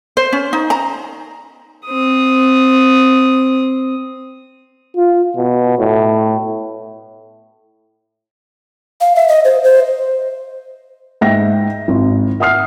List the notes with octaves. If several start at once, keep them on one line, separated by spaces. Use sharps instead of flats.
C5
C#4
D#4
A#5
C4 D#6
F4
B2
A2
F5
E5
D#5
C5
C5
G#2 E5 G5 A#6
G#1
E5 F#5 D#6 F6 C7